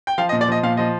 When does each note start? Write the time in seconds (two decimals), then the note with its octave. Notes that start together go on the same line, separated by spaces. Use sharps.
0.07 G5
0.18 F3 F5
0.29 D#5
0.32 A#2
0.41 D5
0.48 F3 D#5
0.63 A#2 F5
0.77 F3 D#5